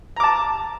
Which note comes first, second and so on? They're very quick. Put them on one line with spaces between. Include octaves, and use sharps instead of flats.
A#5 D6 A5